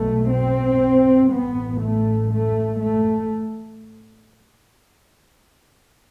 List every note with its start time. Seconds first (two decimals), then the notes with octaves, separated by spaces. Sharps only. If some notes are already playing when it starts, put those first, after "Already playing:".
Already playing: B1 B2 A3
0.30 C4
1.30 A1 A2 B3
1.81 A3
2.30 A3
2.80 A3